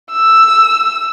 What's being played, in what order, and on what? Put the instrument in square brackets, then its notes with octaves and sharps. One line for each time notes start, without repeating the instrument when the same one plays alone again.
[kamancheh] E6